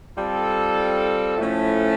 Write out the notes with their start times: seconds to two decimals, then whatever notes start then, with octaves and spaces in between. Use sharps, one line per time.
0.16 G3 C4 F4 A4
1.38 A2 F3 A3 C#4 E4